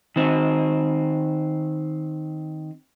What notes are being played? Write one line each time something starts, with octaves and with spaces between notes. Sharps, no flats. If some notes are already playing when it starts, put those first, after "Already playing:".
D#3 C4